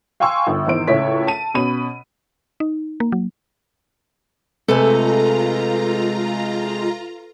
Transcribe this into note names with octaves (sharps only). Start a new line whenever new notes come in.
F5 G5 G#5 C6 C#6 E6
G1
G#1 E2 C5 D7
C#2 A2 C#5 E5 B6
A5 D#7
B2 C#4 B5 D#7
D#4
A#3
F#3
C3 G#3 A3 F4 A4 B4 G#5 A#5